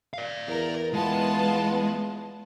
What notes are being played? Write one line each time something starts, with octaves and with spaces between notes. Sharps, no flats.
D5 F5
E2 A#4
G#3 B3 F4 A5